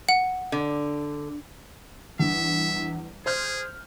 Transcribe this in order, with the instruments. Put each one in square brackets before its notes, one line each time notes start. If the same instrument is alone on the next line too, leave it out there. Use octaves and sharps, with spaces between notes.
[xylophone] F#5
[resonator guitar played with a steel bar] D3
[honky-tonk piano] E2 G2 [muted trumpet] E5
[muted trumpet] G#4 [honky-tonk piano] C5 F6 G6